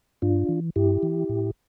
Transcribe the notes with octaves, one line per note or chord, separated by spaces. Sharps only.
G2 D4 F4
E3
G2 E4 G4
E3
A2